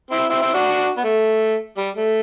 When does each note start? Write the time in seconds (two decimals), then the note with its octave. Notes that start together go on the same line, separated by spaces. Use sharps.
0.11 C4 E4
0.29 C4 E4
0.41 C4 E4
0.54 D4 F#4
0.97 B3
1.04 A3
1.77 G3
1.96 A3